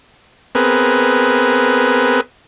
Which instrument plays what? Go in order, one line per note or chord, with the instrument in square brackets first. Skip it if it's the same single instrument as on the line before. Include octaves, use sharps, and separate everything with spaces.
[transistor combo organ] B3 C4 G#4 A#4 B4